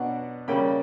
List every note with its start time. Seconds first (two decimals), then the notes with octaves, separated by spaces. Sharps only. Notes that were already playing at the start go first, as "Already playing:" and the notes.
Already playing: B2 F#3 B3 D4 F#5
0.48 C#3 G3 A#3 C#4 G5 B5